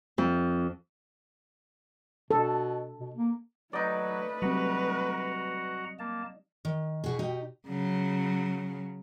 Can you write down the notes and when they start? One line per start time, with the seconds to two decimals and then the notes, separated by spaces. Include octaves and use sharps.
0.18 F2
2.31 B2 A4
3.00 B2
3.16 A#3
3.73 F#3 A3 D#4 B4 D5
4.42 F#3 G3 C4 F#4 F#5 A#5
5.99 A#3 A5
6.65 D#3
7.04 B2 E4 F#4 G#4
7.19 D#4 G4
7.67 C#3 F#3